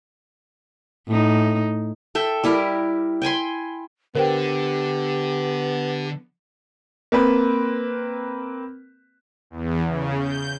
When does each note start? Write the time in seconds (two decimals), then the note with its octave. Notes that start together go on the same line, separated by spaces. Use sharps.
1.08 A2 D#4
2.15 A4 E5 G5
2.44 G3 E4 G4 A#4
3.22 G5 G#5 B5 C6
4.15 D3 B3 G4 A#4 C5 G5
7.12 A#3 C4 B4
9.50 E2
9.86 C#3
10.20 G6